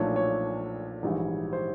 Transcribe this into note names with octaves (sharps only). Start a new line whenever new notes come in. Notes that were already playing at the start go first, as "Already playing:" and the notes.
Already playing: B1 A#2 F3 A3 D4 C#5
C#5
A#1 G#2 E3 G3
C5